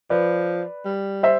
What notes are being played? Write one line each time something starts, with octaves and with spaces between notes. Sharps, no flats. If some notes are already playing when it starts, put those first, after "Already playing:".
F3 B4 D5
G3
C5 E5